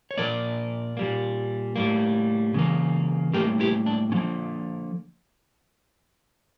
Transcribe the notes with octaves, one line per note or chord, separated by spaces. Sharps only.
C#5
A#2 F3 A#3 A#4 D5
A#2 G3 A#3
A2 G3 A#3
C#3 E3 A#3
A2 G3 A#3 G4 A#4
E4 G4
D4
D3 F3 A#3 C#4